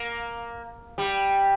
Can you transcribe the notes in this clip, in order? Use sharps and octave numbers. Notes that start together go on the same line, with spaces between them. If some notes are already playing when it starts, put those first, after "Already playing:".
Already playing: A#3
G3